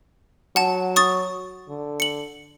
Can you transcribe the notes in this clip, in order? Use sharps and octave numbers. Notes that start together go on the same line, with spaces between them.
F#3 F#5 A5
C#6 D#6 A6
D3
C#7 F#7